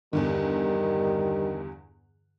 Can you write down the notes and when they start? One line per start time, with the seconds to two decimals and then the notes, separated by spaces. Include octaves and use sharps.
0.13 E2 G2 D3 D#3 G3